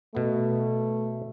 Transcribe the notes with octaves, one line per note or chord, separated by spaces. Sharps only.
B2 A3 B3